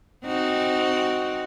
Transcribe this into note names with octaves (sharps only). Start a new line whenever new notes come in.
C4 D#4 F#4